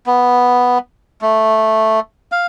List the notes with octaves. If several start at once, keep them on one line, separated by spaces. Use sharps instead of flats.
B3
A3
F5